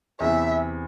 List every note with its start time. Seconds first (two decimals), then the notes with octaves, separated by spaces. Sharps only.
0.20 E2 C3 E3 B3 E4 E5